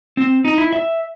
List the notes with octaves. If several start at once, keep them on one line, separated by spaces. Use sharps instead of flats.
C4
D#4
E4
E5